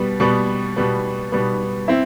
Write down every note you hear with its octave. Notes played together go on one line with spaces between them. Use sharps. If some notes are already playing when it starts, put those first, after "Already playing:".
Already playing: B2 G3 B3
B2 G3 B3
B2 G3 B3
B2 G3 B3
C4 E4